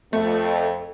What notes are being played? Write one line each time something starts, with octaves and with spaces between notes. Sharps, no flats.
F2 A3 A4